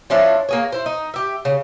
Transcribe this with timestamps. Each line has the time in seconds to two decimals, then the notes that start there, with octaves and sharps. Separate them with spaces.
0.10 F3 C#4 D4 E4
0.49 A#3 G#4 C#5
0.72 E4 C5
0.86 D#4
1.14 G4 E5
1.45 C#3